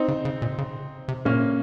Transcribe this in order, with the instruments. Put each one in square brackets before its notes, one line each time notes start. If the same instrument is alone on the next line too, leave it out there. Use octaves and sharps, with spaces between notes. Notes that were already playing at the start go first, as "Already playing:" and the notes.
Already playing: [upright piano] C4 D#4
[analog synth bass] C#3
C#3
A#2
C#3
C3
[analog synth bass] A#2 [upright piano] A#3 C#4